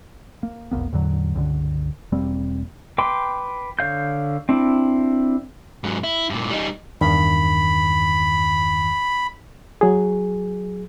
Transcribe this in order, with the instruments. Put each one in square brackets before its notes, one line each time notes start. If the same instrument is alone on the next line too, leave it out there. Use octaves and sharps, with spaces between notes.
[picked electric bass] A#3
F1 B1 A#3 B3
E2 A2 D3 F#3
C#2 G2 D3
E1 G3 A#3 C4
[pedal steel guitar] B4 G5 C6 D6
D3 C#5 F5 G6
C4 D4 E4
[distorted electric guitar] G#2 F#3
E4
G2 A#2
G3 D#4
[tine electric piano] E2 G2 D#3 [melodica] B5
[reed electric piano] F#3 G#4